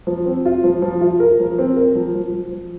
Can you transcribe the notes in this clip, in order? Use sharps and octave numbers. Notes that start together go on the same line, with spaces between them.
F3
C4
F4
F3
F3
F4
A#4
F3
C4
A#4
F3
F3
F3
F3